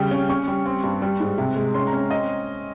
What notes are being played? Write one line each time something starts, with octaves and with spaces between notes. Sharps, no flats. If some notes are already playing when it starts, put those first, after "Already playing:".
Already playing: C#3 G3 G5
C#4
C#4 C#6
G3
C4
G2
G3
G#2
C3
G#3
C#4 C6
A#5
C#4
C4 D#5